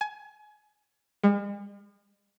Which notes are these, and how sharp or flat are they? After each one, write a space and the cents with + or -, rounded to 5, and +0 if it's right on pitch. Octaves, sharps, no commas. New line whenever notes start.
G#5 +25
G#3 -45